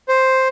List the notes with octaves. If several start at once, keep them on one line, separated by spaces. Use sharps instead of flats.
C5